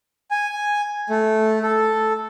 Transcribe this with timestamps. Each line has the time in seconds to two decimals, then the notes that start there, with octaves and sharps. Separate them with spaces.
0.31 G#5
1.09 A3
1.63 A4